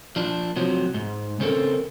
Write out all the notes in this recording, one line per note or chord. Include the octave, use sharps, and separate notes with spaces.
F3 D4
C3 F3 F#3
G#2
C#3 C4 C#4 A4 A#4